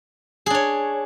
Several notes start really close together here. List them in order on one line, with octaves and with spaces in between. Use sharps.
G#4 D4 C#5